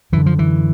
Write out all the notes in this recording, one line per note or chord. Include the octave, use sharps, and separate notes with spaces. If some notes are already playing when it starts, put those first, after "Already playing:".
F#2 D3 E3
F3
E3